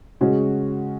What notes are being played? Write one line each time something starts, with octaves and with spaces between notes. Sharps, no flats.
C#3 G#3 C#4 F#4